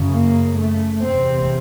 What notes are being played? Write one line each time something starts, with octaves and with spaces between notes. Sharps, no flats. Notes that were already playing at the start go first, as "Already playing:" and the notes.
Already playing: F#2 C#3
A#3
A3
E2 C3 C4